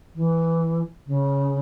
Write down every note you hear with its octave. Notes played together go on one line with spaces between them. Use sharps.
E3
C#3